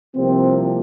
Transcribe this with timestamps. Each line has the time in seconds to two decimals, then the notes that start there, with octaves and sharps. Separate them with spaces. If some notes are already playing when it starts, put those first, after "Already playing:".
0.15 C2 C3 F3 A#3 C4